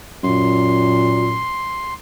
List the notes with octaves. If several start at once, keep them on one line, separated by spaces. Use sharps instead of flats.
F#2 A#2 C6